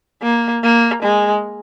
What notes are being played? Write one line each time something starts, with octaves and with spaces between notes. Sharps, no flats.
A#3
A#3
G#3